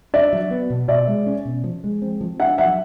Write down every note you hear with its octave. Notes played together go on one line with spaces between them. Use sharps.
D4 D5 E5
F#3
B3
B2
B2 D5 E5
G#3
C#4
B2
F3
G#3
C4
F3
D4 E5 F#5
F#3 E5 F#5